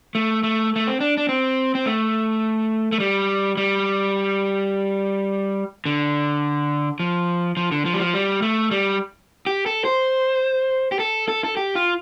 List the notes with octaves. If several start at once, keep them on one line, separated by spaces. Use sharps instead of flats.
A3
A3
A3
C4
D4
D4
C4
C4
A3
A3
G3
G3
D3
F3
F3
D3
F3
G3
F3
G3
A3
G3
G4
A4
C5
G4
A4
A4
A4
G4
F4